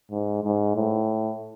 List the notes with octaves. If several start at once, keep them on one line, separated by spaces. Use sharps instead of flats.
G#2
G#2
A2